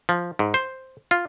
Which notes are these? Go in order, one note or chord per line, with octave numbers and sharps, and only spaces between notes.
F3
G#2
C5
F4